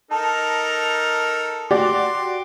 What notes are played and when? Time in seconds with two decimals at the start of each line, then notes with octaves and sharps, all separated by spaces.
0.11 D#4 A4 A#4 A5
1.71 F#4 G4 D5 C6 D6